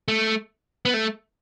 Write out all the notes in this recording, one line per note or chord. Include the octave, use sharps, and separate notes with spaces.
A3
B3
A3